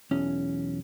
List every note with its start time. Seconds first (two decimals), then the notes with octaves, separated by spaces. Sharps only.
0.11 B1 E2 C#4